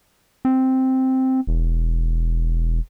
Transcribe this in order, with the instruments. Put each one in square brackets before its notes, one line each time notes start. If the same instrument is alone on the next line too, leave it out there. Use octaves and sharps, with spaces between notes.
[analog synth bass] C4
E1